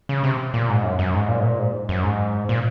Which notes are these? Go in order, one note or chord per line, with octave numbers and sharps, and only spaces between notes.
C#3
C3
A#2
G#2
F#2
F#2
G#2
A#2
G#2
A#2
G#2
F#2
G#2
A#2